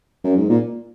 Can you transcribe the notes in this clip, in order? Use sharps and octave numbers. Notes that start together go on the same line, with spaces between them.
F#2
G#2
A#2